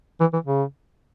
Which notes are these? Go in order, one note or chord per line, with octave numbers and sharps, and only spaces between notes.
E3
E3
C#3